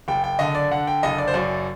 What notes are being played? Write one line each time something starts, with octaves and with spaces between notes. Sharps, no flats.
F#1 G5
G5
D3 D#5
D5
D3 F#5
G5
F#1 D#5
D5
C5
F#2 D5